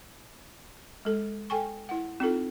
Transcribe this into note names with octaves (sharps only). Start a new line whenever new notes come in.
G#3 A4
A4 G5 G#5 C#6
E4 F#5
C4 D#4 F4 A4